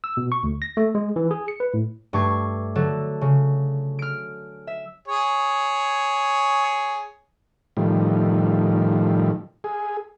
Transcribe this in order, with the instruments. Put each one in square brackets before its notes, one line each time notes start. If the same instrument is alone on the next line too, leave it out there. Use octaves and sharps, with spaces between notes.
[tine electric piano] E6
B2
C#6
D2
A#6
A3
G#3
E3
G#4
C#7
B4
A2
[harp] G2 A3 C#6 D6 G#6 C7
D3 F#3 A4
C#3
F6 D7
E5
[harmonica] G#4 C#5
[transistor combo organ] A2 D#3 F3 G3
G#4